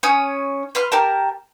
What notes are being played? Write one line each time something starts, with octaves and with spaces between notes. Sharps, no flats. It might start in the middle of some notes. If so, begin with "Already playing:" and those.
C#4 C#5 D#6
B4 C6 F6
G4 A#4 A5